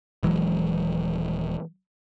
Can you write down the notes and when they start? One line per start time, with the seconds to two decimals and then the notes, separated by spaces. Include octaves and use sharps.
0.23 D#1 E3 F#3 G#3